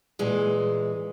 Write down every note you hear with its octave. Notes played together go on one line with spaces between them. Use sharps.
A#2 E3 G#3